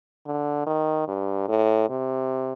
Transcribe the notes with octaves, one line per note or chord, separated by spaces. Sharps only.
D3
D#3
G2
A2
C3